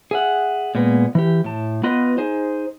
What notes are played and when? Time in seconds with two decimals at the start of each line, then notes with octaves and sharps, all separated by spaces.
0.11 G#4 E5 F#5
0.75 A#2 G#3 B3
1.15 E3 G4
1.44 A2 A5
1.83 B3 F4 B4 D#5
2.18 D#4 G#4 C5